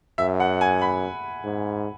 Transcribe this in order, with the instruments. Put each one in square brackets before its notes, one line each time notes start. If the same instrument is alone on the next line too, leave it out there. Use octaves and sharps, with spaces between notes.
[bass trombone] F#2 [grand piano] E5
[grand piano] F#5
G#5
B5
[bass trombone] G#2